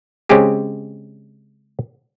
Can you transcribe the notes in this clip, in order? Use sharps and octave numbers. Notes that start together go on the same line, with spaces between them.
C#3 G#3 C4 C#4 G4 G#4